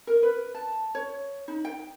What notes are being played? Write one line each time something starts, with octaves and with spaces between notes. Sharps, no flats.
A#4
B4
A5
C#5
D#4
G5